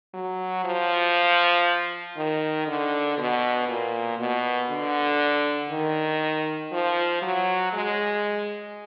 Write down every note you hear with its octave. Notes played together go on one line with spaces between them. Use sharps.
F#3
F3
D#3
D3
B2
A#2
B2
D3
D#3
F3
F#3
G#3